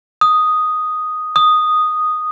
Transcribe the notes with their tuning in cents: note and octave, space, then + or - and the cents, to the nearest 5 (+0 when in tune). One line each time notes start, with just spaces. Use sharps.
D#6 +0
D#6 -5